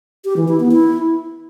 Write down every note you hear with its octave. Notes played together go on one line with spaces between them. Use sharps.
G4
E3
E4
B3
E4